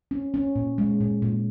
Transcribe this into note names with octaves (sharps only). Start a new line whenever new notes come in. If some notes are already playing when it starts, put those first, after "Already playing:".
C#4
C#4
A#2
G#3
A#2
A#2